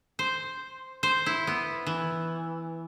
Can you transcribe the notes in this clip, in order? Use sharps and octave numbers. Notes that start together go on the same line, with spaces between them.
C5
C5
E4
B3
E3